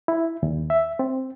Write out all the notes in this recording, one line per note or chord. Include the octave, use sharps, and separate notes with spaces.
E4
D#2
E5
C4